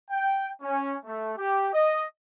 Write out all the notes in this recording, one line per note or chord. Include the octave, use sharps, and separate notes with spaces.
G5
C#4
A3
G4
D#5